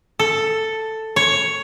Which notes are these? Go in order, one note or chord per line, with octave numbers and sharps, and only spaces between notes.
A4
C#5